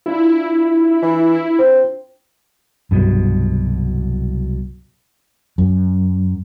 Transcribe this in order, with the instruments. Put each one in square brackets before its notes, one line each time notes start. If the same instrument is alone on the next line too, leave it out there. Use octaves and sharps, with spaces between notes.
[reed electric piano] D4 F4 [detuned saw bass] E4
[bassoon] E3
C4
[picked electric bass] C2 B2 F#3 [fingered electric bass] G2
[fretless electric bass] F#2